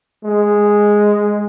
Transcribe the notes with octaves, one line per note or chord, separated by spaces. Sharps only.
G#3